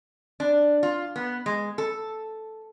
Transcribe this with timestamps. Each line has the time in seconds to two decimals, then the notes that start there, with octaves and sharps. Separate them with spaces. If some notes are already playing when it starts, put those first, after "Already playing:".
0.40 D4
0.83 F4
1.16 B3
1.46 G#3
1.78 A4